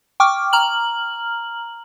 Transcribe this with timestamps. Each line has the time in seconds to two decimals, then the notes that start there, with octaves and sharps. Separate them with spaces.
0.20 G5 C#6 D6 F6
0.53 A#5 F6 F#7